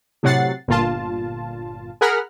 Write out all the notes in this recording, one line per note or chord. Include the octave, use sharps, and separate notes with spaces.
A2 C3 F#3 F#5 A6 C7
G1 A#2 F4 A5
G#4 A#4 F#5 B5 F6